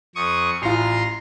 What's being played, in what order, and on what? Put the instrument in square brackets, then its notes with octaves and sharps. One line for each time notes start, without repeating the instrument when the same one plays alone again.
[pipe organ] F2 C#6 D#6
[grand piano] A1 F4 [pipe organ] A#5 C6